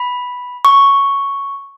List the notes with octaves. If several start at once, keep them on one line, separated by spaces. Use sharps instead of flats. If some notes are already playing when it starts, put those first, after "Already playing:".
Already playing: B5
C#6